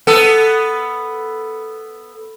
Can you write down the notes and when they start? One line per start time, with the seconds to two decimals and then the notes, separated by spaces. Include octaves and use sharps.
0.07 B3 A4